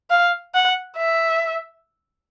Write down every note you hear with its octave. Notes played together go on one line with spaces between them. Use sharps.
F5
F#5
E5